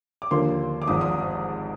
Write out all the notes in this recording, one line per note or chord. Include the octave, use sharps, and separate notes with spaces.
D6
D#2 D3 F3 A#3 C6
D6
G#1 G#2 F3 D#6
D#6